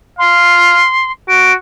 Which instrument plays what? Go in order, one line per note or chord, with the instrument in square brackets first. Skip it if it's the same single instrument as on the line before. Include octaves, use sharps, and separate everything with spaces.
[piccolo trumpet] F5 [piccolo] C6
[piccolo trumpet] F#4 [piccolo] D7